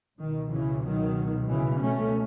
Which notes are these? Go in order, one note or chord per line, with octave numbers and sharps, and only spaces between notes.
C#2 B2 D#3
C#3 E3
D#3 F#3
C#3 E3
A3 C#4